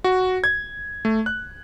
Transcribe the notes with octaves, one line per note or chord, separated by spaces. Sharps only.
F#4
G#6
A3
F#6